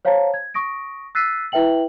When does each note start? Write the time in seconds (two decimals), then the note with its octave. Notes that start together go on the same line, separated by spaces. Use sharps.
0.05 C5 C#5 F5 A5 A#5
0.34 G#6
0.54 C#6 D#6 A#6 D7
1.15 E6 F#6 A6 B6 C7 D#7
1.52 E4 B4 E5 G5 F#7